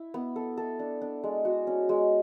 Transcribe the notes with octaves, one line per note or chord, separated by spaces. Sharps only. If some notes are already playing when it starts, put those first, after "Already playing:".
Already playing: E4
B3
A4
A4
D4
D4
G#3
F#4
C#4
G#3